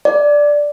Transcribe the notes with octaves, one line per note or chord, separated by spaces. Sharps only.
D5